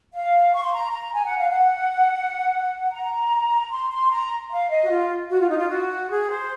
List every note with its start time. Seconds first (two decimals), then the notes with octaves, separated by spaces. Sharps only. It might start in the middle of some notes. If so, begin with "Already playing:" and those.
0.13 F5
0.54 C#6
0.64 C6
0.73 A#5
0.93 A#5
1.13 G#5
1.25 F#5
1.38 F5
1.50 F#5
2.92 A#5
3.72 C6
3.91 C6
4.11 A#5
4.51 F5
4.70 D#5
4.83 F#4
4.90 F4
5.31 F#4
5.40 F4
5.49 D#4
5.58 F4
5.70 F#4
6.10 G#4
6.30 C5